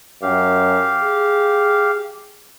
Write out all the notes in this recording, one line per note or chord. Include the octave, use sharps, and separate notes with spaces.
F#2 G4 F5
G#4